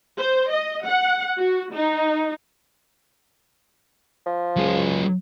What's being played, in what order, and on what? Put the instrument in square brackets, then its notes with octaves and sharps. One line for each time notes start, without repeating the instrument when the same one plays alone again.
[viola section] C5
D#5
F#5
F#4
D#4
[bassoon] F3
[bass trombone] C#2 [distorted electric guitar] F#3 G#4